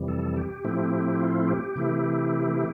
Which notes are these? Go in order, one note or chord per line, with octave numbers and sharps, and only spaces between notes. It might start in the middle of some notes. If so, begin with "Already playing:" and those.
Already playing: F2 C3 E3 G3
A4
G4
A2 F3 A3 C4 E4
F4
G4
C3 E3 A3 E4